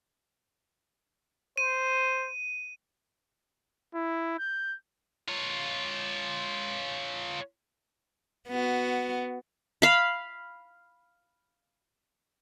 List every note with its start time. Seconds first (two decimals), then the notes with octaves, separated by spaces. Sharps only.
1.57 C5 D#7
3.94 E4
4.39 G6
5.28 F4 C#5
8.49 B3 F#4
9.82 F5 B5